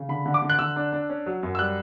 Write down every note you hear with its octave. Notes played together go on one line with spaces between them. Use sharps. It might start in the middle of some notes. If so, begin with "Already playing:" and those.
Already playing: C#3
D3 B5
D3
D6
D3
F#6
D3 E6
D4
D4
C#4
F#3
F#2
E6
G3 F#6